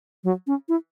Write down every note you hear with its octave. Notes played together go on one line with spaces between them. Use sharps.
F#3
C#4
E4